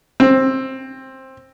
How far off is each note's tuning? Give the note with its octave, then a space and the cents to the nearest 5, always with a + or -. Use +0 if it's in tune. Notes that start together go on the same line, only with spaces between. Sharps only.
C4 +15